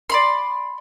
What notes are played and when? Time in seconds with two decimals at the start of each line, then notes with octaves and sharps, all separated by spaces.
0.10 D5 B5 C6